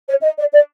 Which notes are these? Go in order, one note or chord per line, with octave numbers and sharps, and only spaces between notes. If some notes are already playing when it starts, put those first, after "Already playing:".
C#5
D#5
D5
D5